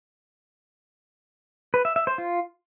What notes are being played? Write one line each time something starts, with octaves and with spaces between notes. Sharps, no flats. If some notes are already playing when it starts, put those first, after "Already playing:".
B4
E5
E5
C5
F4